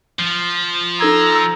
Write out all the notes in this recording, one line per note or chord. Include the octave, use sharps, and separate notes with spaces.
F3 C7
D#4 A4 A#5 E6 G#6